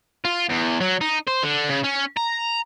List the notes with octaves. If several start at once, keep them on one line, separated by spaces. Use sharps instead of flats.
F4
E2
F#3
D#4
C5
D3
C#3
C#4
A#5